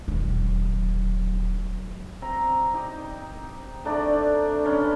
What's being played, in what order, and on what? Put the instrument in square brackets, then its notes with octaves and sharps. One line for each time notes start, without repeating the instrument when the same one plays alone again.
[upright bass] D#1 F#3
[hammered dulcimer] C4 A#5
D#4 G4
A3 D4 D#4 D5
B3 C#4 D4